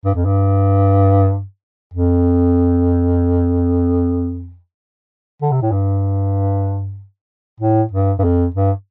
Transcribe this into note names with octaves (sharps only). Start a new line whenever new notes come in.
G2
F2
G2
F2
D3
C3
A2
G2
A2
G2
G2
F2
G2